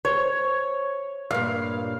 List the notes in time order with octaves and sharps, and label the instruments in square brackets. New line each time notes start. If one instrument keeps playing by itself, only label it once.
[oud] C5 [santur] C#5
[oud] G2 A#2 [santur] F5